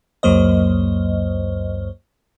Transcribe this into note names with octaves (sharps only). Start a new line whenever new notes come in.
C#2 F#2 F#3 A#3 C5 D#5